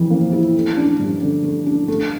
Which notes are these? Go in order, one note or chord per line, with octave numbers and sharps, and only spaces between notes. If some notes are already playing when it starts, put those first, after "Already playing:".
Already playing: F2 E3
A#3
E4
A3
D4
G2
D3
A3
D4
A3